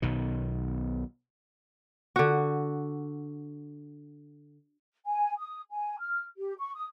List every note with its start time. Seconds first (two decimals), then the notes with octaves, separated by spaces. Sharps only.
0.02 B1 B2 D#3
2.16 D3 F#4
5.05 G#5
5.38 D#6
5.70 G#5
5.98 F6
6.38 G4
6.58 C#6
6.74 D#6